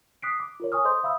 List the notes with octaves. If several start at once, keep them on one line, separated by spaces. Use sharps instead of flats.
D#6 F#6 B6 C7 D7
D6
F4 A#4 C#5
G#5 C#6 D#6 F6
A4 C5 D#5 C6 D#6 G6
E5 F5 B5 D#6 E6